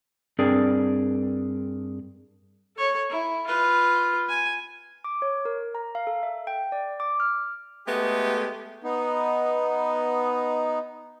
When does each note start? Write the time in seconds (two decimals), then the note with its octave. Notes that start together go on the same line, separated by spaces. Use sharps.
0.39 G2 C4 D4 G#4 A#4 D5
2.77 A4 C#5
3.10 E4
3.47 F4 B4
4.29 G#5
5.04 D6
5.22 C#5
5.45 A#4
5.75 A#5
5.95 F5
6.07 A4
6.23 E5
6.47 G5
6.72 D5
7.00 D6
7.20 F6
7.87 G#3 A3 B3 G4
8.84 B3 D#4